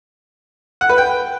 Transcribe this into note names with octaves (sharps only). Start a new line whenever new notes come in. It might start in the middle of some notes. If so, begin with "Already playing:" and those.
F#5
B4
G5